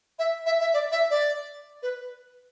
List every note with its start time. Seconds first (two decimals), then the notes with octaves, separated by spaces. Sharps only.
0.19 E5
0.46 E5
0.61 E5
0.74 D5
0.92 E5
1.10 D5
1.83 B4